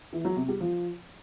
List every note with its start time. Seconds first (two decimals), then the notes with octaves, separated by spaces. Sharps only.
0.13 E3
0.25 F#3
0.37 C3
0.48 G3
0.60 F3